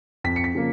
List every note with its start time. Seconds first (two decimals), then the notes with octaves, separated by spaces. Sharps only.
0.24 F2 B6
0.36 C#7
0.44 B6
0.55 C#3 F3 A#3